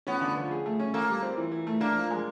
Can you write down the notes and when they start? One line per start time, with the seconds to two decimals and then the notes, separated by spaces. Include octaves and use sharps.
0.07 B3 C#4
0.21 D3
0.37 F3
0.51 G#4
0.66 A3
0.79 C#4
0.94 A#3 A4
1.09 G3
1.23 C4
1.37 E3
1.51 E3
1.67 A3
1.81 A#3 D4
1.95 F3
2.11 G#3